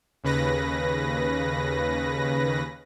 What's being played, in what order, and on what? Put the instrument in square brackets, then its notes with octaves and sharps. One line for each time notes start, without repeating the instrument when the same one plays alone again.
[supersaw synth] D#2 C#3 B4 A#6